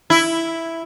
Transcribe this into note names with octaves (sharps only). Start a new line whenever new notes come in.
E4